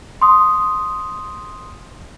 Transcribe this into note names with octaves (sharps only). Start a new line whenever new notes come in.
C6 D#6